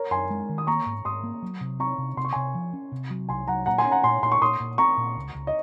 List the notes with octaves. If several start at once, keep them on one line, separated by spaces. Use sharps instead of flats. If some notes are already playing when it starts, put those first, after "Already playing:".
Already playing: A#4 C#5
F#2 G#5 C6
G#3
D#3
D#6
A#3 A#5 C#6
G#2
G#2 C6 D#6
A#3
F#3
C3
C4 A#5 C#6
C3
C3 C6
C#6
C3 G#5 C6
F3
C#4
C3
F#3
C2 G#5 C6
F#3 F#5 A#5
A#2 F#5 A#5
G#5 C6
C#4
F#5 A#5
A#2 G#5 C6
A#2 C6
C#6
A#2 C6 D#6
A#2
C4 A#5 C#6
A#2
C#2
C#2
D#5